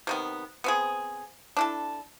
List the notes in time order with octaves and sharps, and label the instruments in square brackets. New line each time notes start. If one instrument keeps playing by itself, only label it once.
[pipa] C3 D#3 B3
B3 C4 G#4
D4 E4 A4